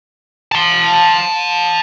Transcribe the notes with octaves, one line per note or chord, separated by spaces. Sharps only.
A5 C6